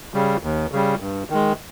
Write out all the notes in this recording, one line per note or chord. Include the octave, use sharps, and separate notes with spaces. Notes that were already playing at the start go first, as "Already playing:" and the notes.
C#3 G3
D#2
C#3 G3
G2
D#3 G#3